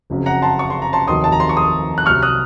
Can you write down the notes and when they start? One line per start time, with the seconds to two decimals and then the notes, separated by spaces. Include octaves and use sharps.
0.10 F#1 F2 C#3 F#3
0.26 F#5 A#5
0.42 A5 C6
0.59 C#6
0.70 C6
0.82 A#5
0.93 A5 C6
1.07 F1 D#2 D#3 F#3 C6 D#6
1.24 A5
1.32 A#5
1.40 C6
1.49 C#6
1.57 C6 D#6
1.98 F#6
2.06 C2 C3 F#3 C#6 F6
2.23 D#6 F#6